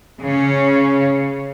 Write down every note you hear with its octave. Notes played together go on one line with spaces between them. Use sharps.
C#3 C#4